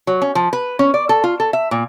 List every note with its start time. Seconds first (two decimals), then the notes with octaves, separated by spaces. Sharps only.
0.07 F#3
0.22 C#4
0.35 F3
0.53 B4
0.79 C#4
0.94 D5
1.09 A4
1.24 F4
1.40 A4
1.53 E5
1.71 A#2